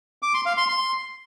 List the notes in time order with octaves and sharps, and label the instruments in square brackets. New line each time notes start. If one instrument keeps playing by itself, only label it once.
[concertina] D6
C6
F5
C6
C6